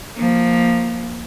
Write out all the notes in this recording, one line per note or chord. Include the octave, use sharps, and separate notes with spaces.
F3 A#3